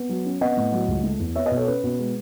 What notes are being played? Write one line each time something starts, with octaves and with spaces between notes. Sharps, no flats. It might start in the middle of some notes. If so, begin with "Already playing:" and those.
Already playing: B3
F#3
C#4
B3 D#5 F#5
A2
F#3
C#2
A3
E2
B3 C#5 E5
B4 D#5
B2
A4 C#5
C#4 B4
B2
G#3